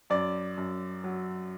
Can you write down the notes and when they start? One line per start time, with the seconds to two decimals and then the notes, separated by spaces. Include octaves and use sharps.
0.10 F#2 D5
0.58 F#2
1.04 F#3